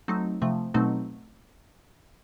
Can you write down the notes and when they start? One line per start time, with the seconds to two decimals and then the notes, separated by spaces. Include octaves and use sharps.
0.08 F#3 A3 C4 D#4
0.42 C3 F3 A3
0.74 B2 F#3 A3 C4 D#4